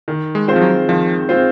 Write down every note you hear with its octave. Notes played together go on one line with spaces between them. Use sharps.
D#3
G#3
G#3 C4 F4 C5
F3
F#3
D#3 F3
G#3 C4 F4 C5